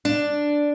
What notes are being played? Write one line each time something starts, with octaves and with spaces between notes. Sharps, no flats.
D4